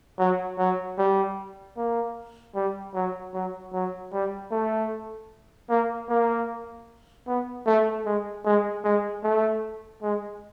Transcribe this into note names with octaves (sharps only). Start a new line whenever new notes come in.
F#3
F#3
G3
A#3
G3
F#3
F#3
F#3
G3
A3
A#3
A#3
B3
A3
G#3
G#3
G#3
A3
G#3